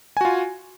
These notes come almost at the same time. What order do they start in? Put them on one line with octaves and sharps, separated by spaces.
G#5 F#4 F4